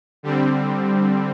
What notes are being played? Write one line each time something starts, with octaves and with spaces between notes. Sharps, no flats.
D3 G3 C4